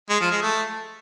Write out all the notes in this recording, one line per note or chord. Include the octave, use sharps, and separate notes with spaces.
G#3
F3
G#3
A3